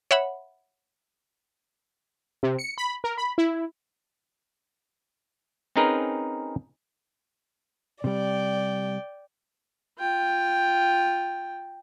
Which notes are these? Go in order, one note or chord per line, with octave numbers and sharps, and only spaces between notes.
C#5 E5 F#5 B5
C3
C#7
B5
A#4
B5
E4
C4 C#4 D#4 G#4 A#4 B4
C3 G3 D5 G5
F4 G5